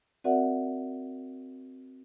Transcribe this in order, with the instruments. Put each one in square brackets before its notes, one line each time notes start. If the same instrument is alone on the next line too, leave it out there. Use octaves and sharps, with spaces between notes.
[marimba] C4 F#4 A#4 D5 E5 F#5